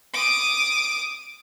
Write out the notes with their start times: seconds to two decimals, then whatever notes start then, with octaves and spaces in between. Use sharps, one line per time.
0.14 D6 D#6